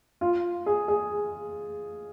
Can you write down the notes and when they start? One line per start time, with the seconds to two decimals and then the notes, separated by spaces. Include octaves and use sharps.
0.21 F4
0.66 G#4
0.88 G#4